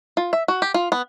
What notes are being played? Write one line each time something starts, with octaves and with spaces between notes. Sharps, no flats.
F4
E5
F#4
G4
F4
B3